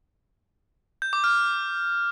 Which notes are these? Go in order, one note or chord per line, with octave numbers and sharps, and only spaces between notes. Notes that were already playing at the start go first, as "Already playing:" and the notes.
G6
D6
F6